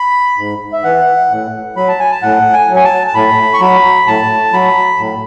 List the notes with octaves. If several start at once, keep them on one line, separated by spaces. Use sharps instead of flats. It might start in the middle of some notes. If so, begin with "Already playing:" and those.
Already playing: B5
G#2
E5
E3 F#5
A2
F#3 B5
A5
G#5
A5
A2 F#5
G#5
F#3
G#5
A5
A5
A2 B5
C#6
F#3 B5
A2 A5
F#3 B5
A2